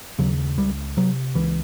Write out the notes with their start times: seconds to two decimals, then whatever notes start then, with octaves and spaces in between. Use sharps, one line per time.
0.19 D#2 C#3 F#3
0.57 C#2 G3
0.97 C3 F#3
1.35 C#2 E3